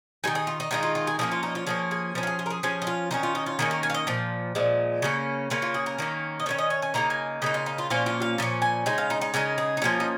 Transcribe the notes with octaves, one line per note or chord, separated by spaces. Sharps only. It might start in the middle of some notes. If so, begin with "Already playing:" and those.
D#3 G#3 D#4 G#5
G#4
F4
D#4
D#3 G#3 D#4 F4
F4
F4
G#4
F3 A#3 C#4 G#4
F4
D#4
F4
F3 A#3 C#4 G#4
G#4
F3 C#4 A#4
F4
G#4
F4
A#4
G#4
F3 C#4 G#4
D#4
F4
D#3 A#3 C#4 D#4
F4
D#4
F4
D#3 A#3 C#4 G#4
A#4
G#5
F5
D#5
A#2 F3
A#2 F3 G#3
C#3 A#3 C#4
C#3 A#3 C#4 F4
F4
G#4
A#4
D#3 A#3 C#4
D#5
D#3 A#3 C#4 C#5
D#5
C#5
G#5
C#3 A#3 D#4 A#5
G#5
C#3 A#3 D#4 D#5
F4
D#4
F4
A#2 F3 A#3 C#4 F4
F4
F5
A#2 F3 C#4
G#5
C#3 G#3 D#4 G#5
F5
D#4
D#4
C#3 G#3 D#4 A#4
G#4
D#4
F3 A#3 C#4 F4
D#4